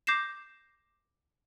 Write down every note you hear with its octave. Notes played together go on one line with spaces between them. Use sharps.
D6 G6 A#6 C7 E7